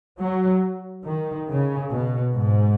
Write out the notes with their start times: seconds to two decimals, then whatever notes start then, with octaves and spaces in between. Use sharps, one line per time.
0.19 F#3
1.05 D#3
1.48 C#3
1.90 B2
2.33 G#2